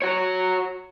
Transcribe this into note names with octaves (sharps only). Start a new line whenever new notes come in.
F#4 C#5